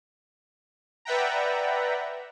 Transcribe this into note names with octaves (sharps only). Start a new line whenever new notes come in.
B4 D5 E5 F#5 G5 A#5